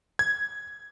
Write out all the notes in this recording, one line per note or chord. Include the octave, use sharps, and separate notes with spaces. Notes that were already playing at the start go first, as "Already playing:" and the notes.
G#6